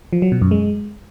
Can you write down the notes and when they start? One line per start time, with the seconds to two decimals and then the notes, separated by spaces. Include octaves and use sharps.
0.13 F3
0.22 F#3
0.32 B2
0.42 F#2
0.51 G#3